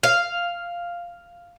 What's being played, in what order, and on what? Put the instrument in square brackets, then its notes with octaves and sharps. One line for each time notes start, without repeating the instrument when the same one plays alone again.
[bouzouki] F5